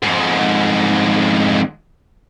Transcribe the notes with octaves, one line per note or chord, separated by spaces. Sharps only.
F2 G#2